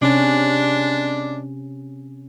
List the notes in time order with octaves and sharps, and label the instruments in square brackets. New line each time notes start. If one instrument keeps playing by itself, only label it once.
[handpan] C3 C#4 [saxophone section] G#3 D4